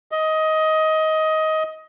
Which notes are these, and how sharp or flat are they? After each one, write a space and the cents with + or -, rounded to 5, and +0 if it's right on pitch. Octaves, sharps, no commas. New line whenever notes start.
D#5 +15